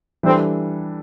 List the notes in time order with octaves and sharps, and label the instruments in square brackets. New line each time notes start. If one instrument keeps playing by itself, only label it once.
[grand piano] E3 G3 D4 A4 [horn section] C4